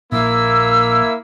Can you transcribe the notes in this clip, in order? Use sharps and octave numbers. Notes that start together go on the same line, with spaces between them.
A#1 A#3 E4 E6